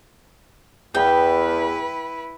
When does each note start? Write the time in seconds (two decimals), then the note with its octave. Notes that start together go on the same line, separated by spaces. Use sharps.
0.95 E2 E4 B4 G5